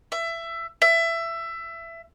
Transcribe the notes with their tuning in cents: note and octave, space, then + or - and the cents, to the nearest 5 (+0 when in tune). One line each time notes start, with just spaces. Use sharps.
E5 +20
E5 +20